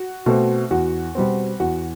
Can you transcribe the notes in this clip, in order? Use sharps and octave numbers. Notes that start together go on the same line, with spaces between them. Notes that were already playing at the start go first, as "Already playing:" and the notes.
Already playing: F#4
B2 A3 C4
E2 F#4
B2 G3 C4
E2 F#4